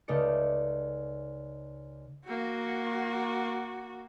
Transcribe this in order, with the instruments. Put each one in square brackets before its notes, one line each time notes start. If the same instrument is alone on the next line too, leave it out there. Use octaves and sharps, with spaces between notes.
[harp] C#2 C#3 A3 D#4 D5 C#7
[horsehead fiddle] A#3 F#4